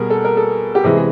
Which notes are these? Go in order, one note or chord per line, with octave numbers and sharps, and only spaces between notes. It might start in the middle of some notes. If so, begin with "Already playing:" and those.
Already playing: B2 G3 G#4 A#4
A4
A#4
A4
G4
C3 E3 G#3 G#4
G#4